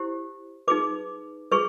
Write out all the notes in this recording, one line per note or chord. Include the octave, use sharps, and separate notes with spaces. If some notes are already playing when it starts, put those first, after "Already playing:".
Already playing: E4 G4 C5
D#4 G#4 B4 D6
G#4 B4 C#6